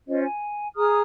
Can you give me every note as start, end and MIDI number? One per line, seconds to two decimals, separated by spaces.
0.08 0.23 61
0.08 0.23 65
0.08 0.23 72
0.08 0.23 75
0.23 0.68 80
0.75 1.02 68
0.75 1.02 82
0.75 1.02 87
0.75 1.02 89